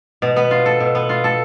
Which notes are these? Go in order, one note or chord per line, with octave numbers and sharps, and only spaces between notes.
B2
B3
F4
A4
B2
B3
F4
A4